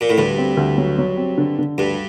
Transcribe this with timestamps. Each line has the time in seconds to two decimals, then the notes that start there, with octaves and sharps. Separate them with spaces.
0.01 A#2
0.09 A2
0.17 D2 G2
0.38 C4
0.57 D2
0.78 F#3
0.98 F#3
1.17 C4
1.38 D3
1.59 D3
1.78 D2 G2